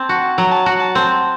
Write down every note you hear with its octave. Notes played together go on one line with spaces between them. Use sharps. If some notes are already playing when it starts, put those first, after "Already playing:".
Already playing: C4 A5
F#4
F#3 A#5
A5
F#4 F#5
A5
C4